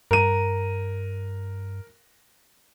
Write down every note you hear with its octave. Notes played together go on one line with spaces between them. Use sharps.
G2 A#4 D#7